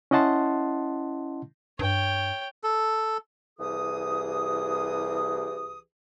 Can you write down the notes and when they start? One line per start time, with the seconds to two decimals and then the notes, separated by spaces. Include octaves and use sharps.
0.11 C#4 E4 D#5 F#5 A5 C6
1.79 G2 C#5 G5
2.64 A4
3.59 C2 E3 G4 G#4 D#6